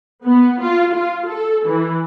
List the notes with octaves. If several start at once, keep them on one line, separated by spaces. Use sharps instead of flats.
B3
F4
F4
A4
E3